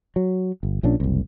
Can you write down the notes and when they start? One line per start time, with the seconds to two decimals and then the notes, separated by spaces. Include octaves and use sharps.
0.16 F#3
0.63 G1
0.83 A#1 A#2 C#4 D4
1.00 F#1 C2